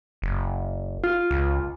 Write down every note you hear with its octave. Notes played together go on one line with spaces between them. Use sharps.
F#1
F4
C#2